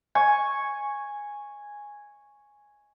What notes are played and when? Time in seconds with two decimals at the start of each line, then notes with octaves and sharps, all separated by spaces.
0.15 G#5 C#6